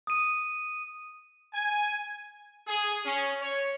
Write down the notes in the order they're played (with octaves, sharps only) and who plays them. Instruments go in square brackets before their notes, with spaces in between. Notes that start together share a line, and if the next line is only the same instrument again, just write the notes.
[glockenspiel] D#6 D#7
[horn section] G#5
[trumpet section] G#4
C#4
C#5